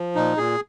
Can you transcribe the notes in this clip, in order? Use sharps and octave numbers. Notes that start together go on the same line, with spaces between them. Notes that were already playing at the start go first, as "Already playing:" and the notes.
Already playing: F3
A#2 D#4
A#2 G#4